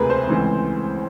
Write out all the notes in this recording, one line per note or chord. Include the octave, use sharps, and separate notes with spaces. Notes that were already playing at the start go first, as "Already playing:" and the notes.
Already playing: E1 D2 C3 F3 A3 G#4 A#4 B4
C5
C#2 C#3 E3 A3 C4